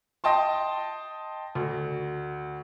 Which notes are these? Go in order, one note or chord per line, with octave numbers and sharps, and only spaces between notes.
D#5 G5 A5 C6
D2